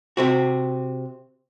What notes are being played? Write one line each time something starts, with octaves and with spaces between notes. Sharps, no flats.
C3 C4 F#4